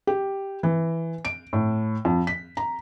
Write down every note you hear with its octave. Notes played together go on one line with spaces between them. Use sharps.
G4
E3
D7
A2
F2
B6
A#5